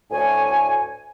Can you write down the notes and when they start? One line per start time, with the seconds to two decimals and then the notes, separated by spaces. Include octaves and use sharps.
0.11 D2 A2 C#5 G#5